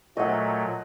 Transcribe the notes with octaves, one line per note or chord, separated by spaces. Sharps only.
A#2 F#3 A3 D#5 F#5